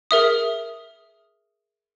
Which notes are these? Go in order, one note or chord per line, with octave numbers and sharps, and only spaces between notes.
G#4 A#4 E5 D#6